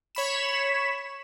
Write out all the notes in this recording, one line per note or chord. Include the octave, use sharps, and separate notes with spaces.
C#5 B5 E7